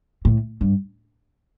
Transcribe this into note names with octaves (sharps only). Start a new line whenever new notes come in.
A2
G2